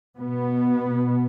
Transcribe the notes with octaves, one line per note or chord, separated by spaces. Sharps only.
B2 B3